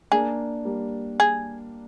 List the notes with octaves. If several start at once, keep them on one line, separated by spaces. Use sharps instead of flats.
A#3 D4 G#4
G3 A#3
G#4